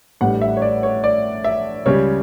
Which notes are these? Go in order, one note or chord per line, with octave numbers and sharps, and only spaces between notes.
A1 A2 G3 D4 F#5
E5
C#5
D5
C#5
D5
E5
C#2 C#3 G3 C#5